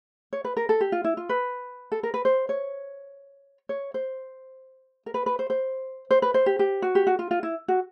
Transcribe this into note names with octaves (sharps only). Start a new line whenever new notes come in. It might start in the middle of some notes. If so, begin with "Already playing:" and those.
C#5
B4
A#4
A4
G4
F4
E4
F4
B4
A4
A#4
B4
C5
C#5
C#5
C5
A#4
B4
B4
C5
C5
C5
B4
C5
G4
G4
F#4
G4
F#4
F4
F4
E4
F#4